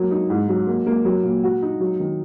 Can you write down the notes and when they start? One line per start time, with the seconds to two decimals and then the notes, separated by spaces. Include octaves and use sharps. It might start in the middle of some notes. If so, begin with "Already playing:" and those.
Already playing: F#3 A#3
0.11 D#4
0.30 G#2
0.48 F#3
0.67 A#3
0.86 A#3
1.05 F#3
1.24 A#2
1.43 F#4
1.62 D#4
1.80 F#3
2.00 D#3